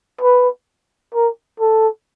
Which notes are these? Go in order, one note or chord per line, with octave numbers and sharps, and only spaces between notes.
B4
A#4
A4